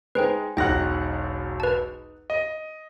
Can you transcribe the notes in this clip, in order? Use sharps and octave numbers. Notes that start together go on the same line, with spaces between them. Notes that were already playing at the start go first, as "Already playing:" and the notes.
G#3 D#4 B4 C5 G5
E1 B1 D#4 F#5 G5 F#6 A#6
B4 A5
D#5